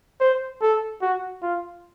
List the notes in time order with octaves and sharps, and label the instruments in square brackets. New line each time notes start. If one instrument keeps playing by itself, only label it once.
[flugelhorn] C5
A4
F#4
F4